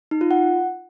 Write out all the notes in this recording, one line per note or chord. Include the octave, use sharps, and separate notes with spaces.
D#4
F4
F#5